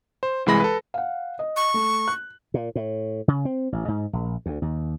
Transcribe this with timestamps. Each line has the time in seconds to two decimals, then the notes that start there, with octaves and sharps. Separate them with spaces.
0.23 C5
0.46 C2 E3 G#3 B5 A#6
0.60 A4 B4
0.94 F5 F#5
1.39 D#5
1.56 C#6
1.74 A3
2.08 F#6
2.54 A#2
2.75 A2
3.28 C#3
3.45 C4
3.72 A1
3.88 G#2
4.13 A#1
4.46 D2
4.62 D#2